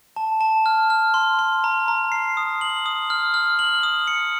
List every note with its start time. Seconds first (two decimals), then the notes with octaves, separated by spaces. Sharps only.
0.16 A5
0.41 A5
0.66 F6
0.90 F6
1.14 C6
1.39 C6
1.64 A#5
1.88 A#5
2.12 C7
2.37 D#6
2.61 F#7
2.86 D#6
3.10 F6
3.34 F6
3.59 F#7
3.83 D#6
4.08 C#7